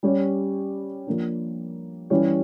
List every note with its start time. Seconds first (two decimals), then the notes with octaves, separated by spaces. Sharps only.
0.03 G3 C#4 G4 C#5
1.07 F3 A#3 D4
2.10 E3 G3 C#4 G4 C#5